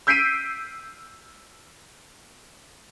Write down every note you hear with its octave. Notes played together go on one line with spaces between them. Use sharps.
E6 G6 B6 C7 D7 D#7